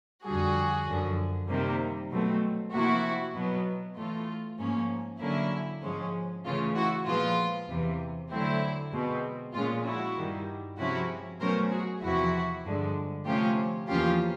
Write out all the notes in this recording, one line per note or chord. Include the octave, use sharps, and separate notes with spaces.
F2 D3 G3 F#4 G#4
F#2 D3 F3
C3 D#3 G3 A#3
B2 F#3 A3 C4
C3 F3 A#3 E4 F#4
B2 F#3 B3
A2 E3 A3 F4
G#2 F3 A#3 C#4
D3 F#3 A#3 C#4 E4
G#2 F3 G#3 C#4
C#3 E3 A3 C#4 F4
E4 F#4
A#2 F3 G#3 B3 F4
E2 C3 E3
D3 F#3 A3 C4 E4
B2 G#3 C4
A#2 F3 G#3 C#4 F4
E4 F#4
G2 D#3 G3
C3 F3 G#3 C#4 E4 F#4
B2 F#3 A3 C#4 A#4 C5
F#4 G#4
E2 C3 F3 E4 F#4
G2 D3 F3 G#3
C3 F3 A3 C#4 F4 G4
E2 C#3 F3 A#3 C#4 F4 G4